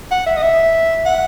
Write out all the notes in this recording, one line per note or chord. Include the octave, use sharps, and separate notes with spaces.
F#5
E5
D#5
E5
F#5